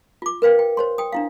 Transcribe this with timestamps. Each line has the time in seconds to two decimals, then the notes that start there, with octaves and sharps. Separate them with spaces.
0.22 F4 D6
0.42 A#4 B4 F5 G5
0.59 G5
0.77 C5 C#5 C6
0.98 G5 D#6
1.12 D4 E4 F5